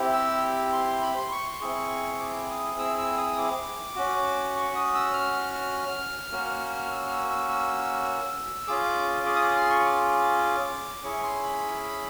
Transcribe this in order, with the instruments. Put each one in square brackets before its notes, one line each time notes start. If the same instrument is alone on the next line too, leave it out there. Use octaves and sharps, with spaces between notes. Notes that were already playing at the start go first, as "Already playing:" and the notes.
Already playing: [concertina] C4 E4 G4
E6
C6
B5
C6
C#6
C6
C4 E4 G#4 C#6
D6
D#6
E6
E6
D#6
D6
C#4 F#4
C#6
D#6
E6
F6
A#3 C#4 F#4
E6
F6
E6
E6
E6
C#4 F4 G#4 D6
D6
D#6
D6
C6
C#6
D6
C#4 E4 G#4 C#6
C6
B5